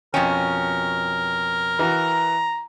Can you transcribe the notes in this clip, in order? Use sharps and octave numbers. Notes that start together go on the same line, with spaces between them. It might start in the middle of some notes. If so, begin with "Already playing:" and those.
F2 B2 C#4 A#4 G5
E3 F#4 A#5